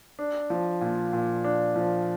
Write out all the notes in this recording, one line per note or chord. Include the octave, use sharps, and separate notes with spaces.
D4
F3
A#2
A#2
D4
F3